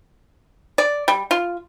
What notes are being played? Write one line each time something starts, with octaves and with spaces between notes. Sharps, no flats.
D5
G3
F4